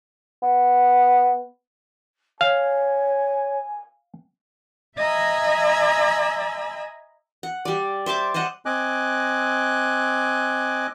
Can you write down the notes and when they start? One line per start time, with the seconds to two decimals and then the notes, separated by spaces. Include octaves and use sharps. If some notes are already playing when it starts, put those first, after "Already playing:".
0.42 B3
2.41 C#5 F5 G#5
4.97 D#5 E5 G#5 A#5 B5 E6
7.43 F#5
7.65 G3 D5
8.06 C5 E5 A5 D6
8.34 C5 D5 D#5 F#5
8.66 C4 D#5 G#5 D6 F#6